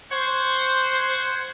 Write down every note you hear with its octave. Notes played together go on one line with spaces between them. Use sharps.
C5 F#5 C#6 G#6